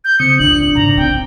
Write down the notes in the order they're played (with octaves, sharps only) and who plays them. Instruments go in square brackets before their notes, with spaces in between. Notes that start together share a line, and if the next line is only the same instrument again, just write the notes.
[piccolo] G6
[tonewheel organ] C#3 C4 D#6 [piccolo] C#7
[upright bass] G#1 C#2 [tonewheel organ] D4 [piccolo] F#7
[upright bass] G#2 C#3 [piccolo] A#5
[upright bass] C4 [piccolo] G5